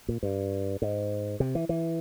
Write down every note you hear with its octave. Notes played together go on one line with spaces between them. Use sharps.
A#2
G2
G#2
C3
E3
E3